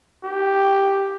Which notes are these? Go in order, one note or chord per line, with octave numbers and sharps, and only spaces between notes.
G4